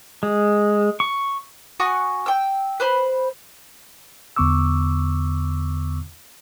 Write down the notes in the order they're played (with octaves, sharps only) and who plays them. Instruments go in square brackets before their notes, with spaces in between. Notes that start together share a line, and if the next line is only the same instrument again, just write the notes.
[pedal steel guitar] G#3
C#6
[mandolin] F#4 F#5 G#5 D#6
G5 E6
B4 C5 B5
[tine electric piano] E2 D3 B3 C#6 D6 E6